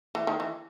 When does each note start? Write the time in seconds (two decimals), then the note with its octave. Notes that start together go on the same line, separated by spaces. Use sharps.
0.15 E3
0.27 D#3
0.40 E3